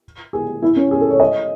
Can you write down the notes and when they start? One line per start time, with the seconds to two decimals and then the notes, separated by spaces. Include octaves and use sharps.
0.33 G#4
0.62 E4
0.76 C#4
0.91 G#4
1.01 A4
1.10 C#5
1.20 D#5